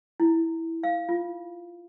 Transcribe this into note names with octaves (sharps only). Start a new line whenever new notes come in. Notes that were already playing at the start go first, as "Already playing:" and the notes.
E4
F5
F4